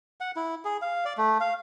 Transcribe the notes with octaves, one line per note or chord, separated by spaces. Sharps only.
F#5
E4
G#4
F5
D5
A3
F5